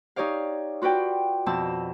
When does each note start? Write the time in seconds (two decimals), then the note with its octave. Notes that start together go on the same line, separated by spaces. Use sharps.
0.16 D#4 G4 C#5 D5 F5
0.82 F4 F#4 B4 D5 G5
1.46 F2 B2 C4 A5 E6